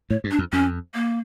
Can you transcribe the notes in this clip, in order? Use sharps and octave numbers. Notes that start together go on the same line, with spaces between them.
A2 C#5
G2
D4
F2
F2 C#4
A#3